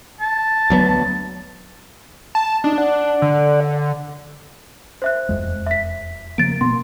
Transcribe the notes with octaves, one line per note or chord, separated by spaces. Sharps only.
A5
D2 F#3 B3
A5
A5
D4 D#4
D5 F#5
D3
C5 E5 F#6
E1 F2 G#3
E5 B6
C#3 F3 A#3 A6 D7
B2 A#3 B3 C6